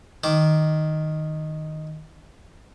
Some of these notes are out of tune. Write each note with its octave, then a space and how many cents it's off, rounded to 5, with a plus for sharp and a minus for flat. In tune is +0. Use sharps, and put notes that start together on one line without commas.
D#3 +0 D6 +10